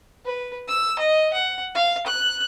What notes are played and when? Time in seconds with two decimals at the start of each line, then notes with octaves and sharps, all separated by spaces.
0.25 B4
0.68 E6
0.99 D#5
1.33 F#5
1.75 F5
2.07 F#6